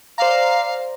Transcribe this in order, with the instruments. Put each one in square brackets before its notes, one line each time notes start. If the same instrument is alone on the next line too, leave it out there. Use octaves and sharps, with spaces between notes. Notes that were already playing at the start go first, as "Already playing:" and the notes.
[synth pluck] C5 D5 A#5 [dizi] F5